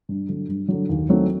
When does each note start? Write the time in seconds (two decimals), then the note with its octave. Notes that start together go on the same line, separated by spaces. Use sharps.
0.09 G2
0.29 D3 F#3
0.49 G2
0.68 D3 F#3
0.89 D#2
1.09 D#3 F#3 A3 C4